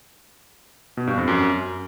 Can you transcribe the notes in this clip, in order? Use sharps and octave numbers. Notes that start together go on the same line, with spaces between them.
B2
G2
F2
F#2